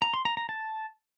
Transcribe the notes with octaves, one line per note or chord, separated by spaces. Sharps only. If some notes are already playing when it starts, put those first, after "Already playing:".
A#5
C6
A#5
A#5
A5